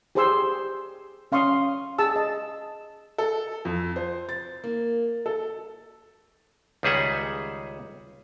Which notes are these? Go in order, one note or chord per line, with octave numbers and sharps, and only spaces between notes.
G4 G#4 C5 G#5 C6 E6
C#4 F5 C6 C#6 D#6
G#4 A5 E6
D#5
A4
F2
C5
A6
A#3
A4
C#2 D#3 G3 G#4 E5 F#5